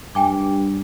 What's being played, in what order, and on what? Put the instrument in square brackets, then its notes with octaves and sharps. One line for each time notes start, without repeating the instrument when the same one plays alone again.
[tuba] G2 [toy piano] G5 G#5 D6